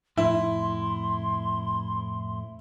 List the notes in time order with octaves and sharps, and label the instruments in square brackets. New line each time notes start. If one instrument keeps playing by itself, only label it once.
[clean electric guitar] F2 A2 [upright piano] E4 [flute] C6